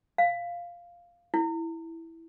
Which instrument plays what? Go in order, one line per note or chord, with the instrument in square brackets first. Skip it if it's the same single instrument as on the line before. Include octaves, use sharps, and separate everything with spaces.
[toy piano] F5
E4